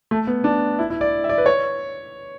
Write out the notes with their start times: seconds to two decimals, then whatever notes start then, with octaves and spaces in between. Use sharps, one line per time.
0.11 A3
0.27 B3
0.44 D4
0.79 E4
0.90 E4
1.01 D5
1.24 E5
1.29 D5
1.38 B4
1.46 C#5